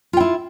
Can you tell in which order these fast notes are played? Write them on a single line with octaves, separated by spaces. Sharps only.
F4 G5 E4